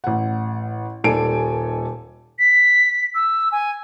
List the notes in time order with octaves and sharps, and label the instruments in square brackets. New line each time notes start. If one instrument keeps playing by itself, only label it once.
[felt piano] A1 F#5
D#1 D#3 G3 A4 G#5 D7
[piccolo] B6
E6
G#5